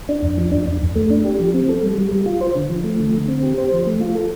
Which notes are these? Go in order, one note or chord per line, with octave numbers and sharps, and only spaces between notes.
D4
F2
F3
D4
F2
F2
A3
D4
G4
F3
C4
A4
G3
G3
G3
F4
C5
D3
F3
A3
D3
D3
C4
G4
C5
F3
A3
F4
A4